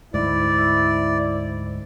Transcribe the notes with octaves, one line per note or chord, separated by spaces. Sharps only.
D2 G#2 E4 D5